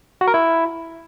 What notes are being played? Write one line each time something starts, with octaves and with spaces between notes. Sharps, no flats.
F#4
A#4
E4